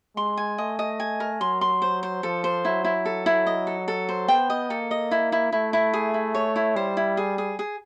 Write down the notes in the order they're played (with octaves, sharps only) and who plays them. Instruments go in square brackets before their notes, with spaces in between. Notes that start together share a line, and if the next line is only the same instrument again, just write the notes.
[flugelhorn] G#3 [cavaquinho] C6
[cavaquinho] G#5
[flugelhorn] A3 [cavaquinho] D#5
[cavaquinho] D#5
G#5
A#4
[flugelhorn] F#3 [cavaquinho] C6
[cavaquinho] C6
C5
C5
[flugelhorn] F3 [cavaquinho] A4
[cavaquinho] C5
[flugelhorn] F#3 [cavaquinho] E4
[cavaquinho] E4
A4
E4
D#5
A4
A4
C5
[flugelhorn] B3 [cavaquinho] G5
[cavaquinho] D#5
[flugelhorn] A#3 [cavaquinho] A4
[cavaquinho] D#5
E4
E4
[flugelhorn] A3 [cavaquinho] E4
[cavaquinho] E4
G#4
E4
C#5
E4
[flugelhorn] G3 [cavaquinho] C5
[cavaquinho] E4
G#4
G#4
G#4